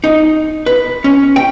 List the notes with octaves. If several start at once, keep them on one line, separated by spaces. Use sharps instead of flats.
D#4
B4
C#4
G5